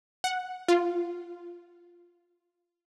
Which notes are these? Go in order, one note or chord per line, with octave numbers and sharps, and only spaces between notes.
F#5
F4